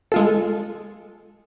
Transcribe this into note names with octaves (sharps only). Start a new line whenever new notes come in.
G#3 F4 A4